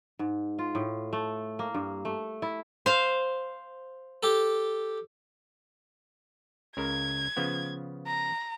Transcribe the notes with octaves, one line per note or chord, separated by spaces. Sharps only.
G#2
F4
A2
A3
A#3
G2
A3
E4
C5 F5
G4 A4
C#2 C#3 A#4 G#6
C#3 F3 B3
A#5